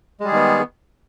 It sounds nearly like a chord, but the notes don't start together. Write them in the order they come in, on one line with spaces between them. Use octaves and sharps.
G#3 G3 G#4 D#3 B3